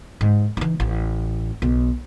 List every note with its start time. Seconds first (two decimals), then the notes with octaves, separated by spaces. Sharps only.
0.21 G#2
0.57 E3 D#4
0.80 A1
1.62 B1